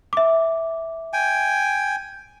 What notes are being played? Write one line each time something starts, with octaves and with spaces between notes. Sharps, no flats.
E5 D6
G5 G#5